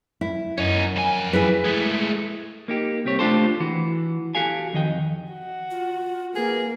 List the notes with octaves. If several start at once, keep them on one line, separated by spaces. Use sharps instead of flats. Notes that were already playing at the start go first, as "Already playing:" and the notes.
E4
F#2 C#4 D#4
F2 G#5
E4 G#4 B4
G#3 A3
A#3 D#4 G4
C2 C4 G4 C#5
A3 D4 F4 G4 A4 C5
E3 F#4
F#4 G4 A4 F5 G#5
F2 D#3 D#5 G5
F#4
F4
A#3 G#4 B4